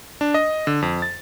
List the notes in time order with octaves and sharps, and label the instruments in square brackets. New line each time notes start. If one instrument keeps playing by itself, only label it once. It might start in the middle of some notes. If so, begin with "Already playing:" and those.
[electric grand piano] D4
D#5
D3
F2
A6